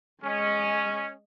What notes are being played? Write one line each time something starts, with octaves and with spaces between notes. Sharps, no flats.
G#3 C#4 D#5